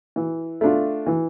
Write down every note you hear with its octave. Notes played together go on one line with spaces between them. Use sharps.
E3
A3 D4 F4
E3